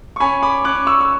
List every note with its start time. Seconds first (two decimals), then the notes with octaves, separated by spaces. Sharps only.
0.16 C#6
0.20 C#4 G#5 B5
0.43 B5 D6
0.64 C#4 D6 F#6
0.87 C#6 E6
1.00 E6